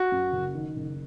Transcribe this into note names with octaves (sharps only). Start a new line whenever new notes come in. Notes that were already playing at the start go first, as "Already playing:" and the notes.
Already playing: F#4
F#2
F#1
D#3
F#1